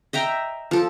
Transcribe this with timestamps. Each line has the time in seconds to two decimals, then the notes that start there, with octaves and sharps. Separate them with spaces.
0.13 D#5 E5 G5 A#5
0.71 F3 A4